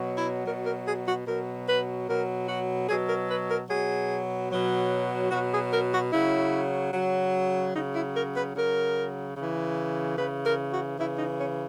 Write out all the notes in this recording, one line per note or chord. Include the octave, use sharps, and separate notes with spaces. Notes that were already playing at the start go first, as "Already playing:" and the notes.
Already playing: B2 F#3
E4
B2 F#3 A#4
A#4
G#4
F#4
B2 F#3 A#4
B4
B2 F#3 A#4
F#4
B2 F#3 G#4
A#4
B4
A#4
B2 F#3 G#4
B2 F#3
B2 F#3 F#4
G#4
A#4
F#4
C#3 F#3 E4
C#3 F#3
C#3 F#3 D#4
E4
A#4
B4
C#3 F#3 A#4
C#3 E3
C#3 E3 B4
A#4
F#4
C#3 E3 E4
D#4
C#4